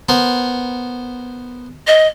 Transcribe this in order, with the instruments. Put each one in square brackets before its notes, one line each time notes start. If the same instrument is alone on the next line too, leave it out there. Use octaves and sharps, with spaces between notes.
[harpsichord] B3 A#4 C5
[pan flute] D#5